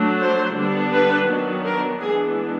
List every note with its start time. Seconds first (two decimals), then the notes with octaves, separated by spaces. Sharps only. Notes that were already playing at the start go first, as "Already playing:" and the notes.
Already playing: F#3 A3 D4
0.20 C5
0.56 D3 G3 B3 D4
0.93 B4
1.28 D#3 F#3 B3 D4
1.64 A#4
2.00 E3 G#3 B3 D4 G#4